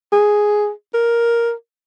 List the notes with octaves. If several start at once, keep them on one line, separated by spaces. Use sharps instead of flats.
G#4
A#4